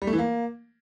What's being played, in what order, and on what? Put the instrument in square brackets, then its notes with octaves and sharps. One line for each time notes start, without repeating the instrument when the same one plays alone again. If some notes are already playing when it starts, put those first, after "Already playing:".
[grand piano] G3
A3
E3
A#3